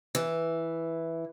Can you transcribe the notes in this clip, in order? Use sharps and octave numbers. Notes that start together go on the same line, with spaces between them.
E3